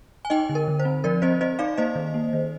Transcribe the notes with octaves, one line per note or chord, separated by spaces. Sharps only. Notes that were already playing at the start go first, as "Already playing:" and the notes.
G#5
D#4 D#5 G5
D3
A#4
D3
C5
C4
F3 A#4 D5
C4 C5 D#5
C4 C5 D#5
D#4 D5 F5
A#3 C5 D#5
D#3
A#3
D#3